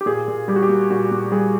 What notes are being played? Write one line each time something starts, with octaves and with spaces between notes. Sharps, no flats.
G4
A#2 G#4
A#2
G3 G4
F#4
G4
A#3
A#2 F#4
A#2
G3 G#4